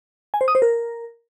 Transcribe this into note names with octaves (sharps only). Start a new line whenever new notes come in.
G#5
C5
D#6
C5
A#4